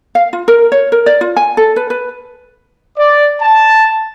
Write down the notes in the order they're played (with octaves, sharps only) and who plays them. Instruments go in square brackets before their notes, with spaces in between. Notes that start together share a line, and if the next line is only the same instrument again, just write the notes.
[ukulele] F5
F4
A#4
C#5
A#4
D5
F4
G#5
A4
B4
B4
[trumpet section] D5
A5